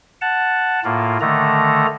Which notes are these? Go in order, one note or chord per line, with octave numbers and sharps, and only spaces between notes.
F#5 A5
A2 A#3 F4
D3 D#3 A3 A#5